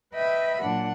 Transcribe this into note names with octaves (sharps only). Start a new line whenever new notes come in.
B4 D#5 E5 G5 B5
A#2 F#3 D4 F#5